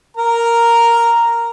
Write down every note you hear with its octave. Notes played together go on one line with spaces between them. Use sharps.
A#4 A#5